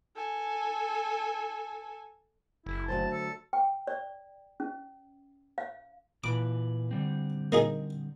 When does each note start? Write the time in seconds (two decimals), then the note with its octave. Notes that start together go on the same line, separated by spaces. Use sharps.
0.16 A4 G#5
2.66 F#1 E4
2.88 D2 F#3 C5 A5
3.12 A4
3.53 G5
3.87 D5
4.60 C#4
5.58 F5
6.24 A#2 E3 B4 D6
6.91 D3 G3 C4
7.52 A#3 D#4 G#4